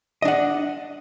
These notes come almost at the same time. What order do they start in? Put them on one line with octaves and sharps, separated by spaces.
D#5 D4 F#5